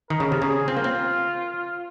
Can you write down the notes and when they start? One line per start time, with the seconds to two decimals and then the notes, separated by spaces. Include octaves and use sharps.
0.10 D#3 A#4
0.20 C#3
0.32 C3
0.39 C#3 G#4
0.68 C4 F4
0.77 A#3
0.84 C4